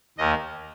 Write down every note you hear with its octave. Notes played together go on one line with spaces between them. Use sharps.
D#2 D#3 A#3 D#5